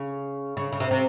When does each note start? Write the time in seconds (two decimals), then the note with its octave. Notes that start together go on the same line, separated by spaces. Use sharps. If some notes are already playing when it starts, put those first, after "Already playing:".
Already playing: C#3
0.57 C#3
0.72 C#3
0.80 C3
0.91 C3